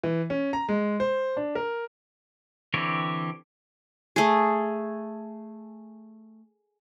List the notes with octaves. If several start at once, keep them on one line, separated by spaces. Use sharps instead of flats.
E3
C#4
A#5
G#3
C5
D4
A#4
D3 E3 C4 G4 C#5
A3 G#4